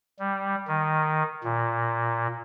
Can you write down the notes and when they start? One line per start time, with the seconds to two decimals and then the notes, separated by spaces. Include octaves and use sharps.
0.19 G3
0.68 D#3
1.44 A#2